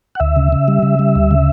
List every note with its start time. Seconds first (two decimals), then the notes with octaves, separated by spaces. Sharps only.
0.15 F#5
0.20 D2 E5
0.36 C#3
0.52 C#3
0.68 G3
0.83 C#3
0.99 G3
1.15 D2
1.31 C#3